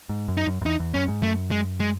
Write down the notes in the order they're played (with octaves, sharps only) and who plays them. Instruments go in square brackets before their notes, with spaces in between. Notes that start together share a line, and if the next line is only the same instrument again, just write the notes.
[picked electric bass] G#2
F#2
[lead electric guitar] D#4
[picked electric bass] F#2
F#2
[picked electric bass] E2 [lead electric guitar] D#4
[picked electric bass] E2
[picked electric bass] F#2 [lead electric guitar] C#4
[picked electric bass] G#2
[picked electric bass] F#2 [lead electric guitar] A3
[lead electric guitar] G#3
G#3